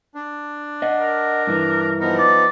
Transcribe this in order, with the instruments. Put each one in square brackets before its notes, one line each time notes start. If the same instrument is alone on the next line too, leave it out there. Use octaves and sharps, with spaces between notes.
[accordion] D4
[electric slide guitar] D#5 F#5
[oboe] A#4
[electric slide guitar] G2 E3
[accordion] F3 B3 D#4 [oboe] A#4
[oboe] D5